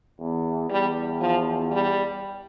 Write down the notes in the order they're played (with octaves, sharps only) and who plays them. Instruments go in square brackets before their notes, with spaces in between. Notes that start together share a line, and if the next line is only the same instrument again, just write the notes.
[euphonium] E2
[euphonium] E2 [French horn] G3
[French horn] F3
G3